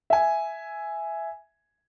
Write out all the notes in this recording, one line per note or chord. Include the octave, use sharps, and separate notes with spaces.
E5 G#5